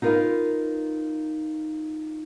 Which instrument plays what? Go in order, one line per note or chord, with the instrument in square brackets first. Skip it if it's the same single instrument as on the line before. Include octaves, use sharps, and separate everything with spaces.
[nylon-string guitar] D#4 F4 A#4 B4